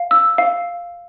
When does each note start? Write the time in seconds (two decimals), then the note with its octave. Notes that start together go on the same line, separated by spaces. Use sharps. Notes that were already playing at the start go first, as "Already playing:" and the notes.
Already playing: F5
0.11 E6
0.38 F5